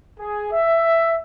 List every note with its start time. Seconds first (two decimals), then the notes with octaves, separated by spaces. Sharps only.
0.19 G#4
0.52 E5